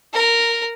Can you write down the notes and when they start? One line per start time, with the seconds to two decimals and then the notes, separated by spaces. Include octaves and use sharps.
0.13 A#4